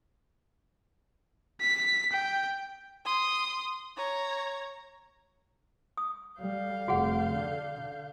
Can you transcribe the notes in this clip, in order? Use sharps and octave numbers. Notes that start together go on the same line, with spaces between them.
B6
G5
C6 D#6
C#5 A#5
D#6
G3 A4 F5 G6
F1 F#4 G#4 F#5
D3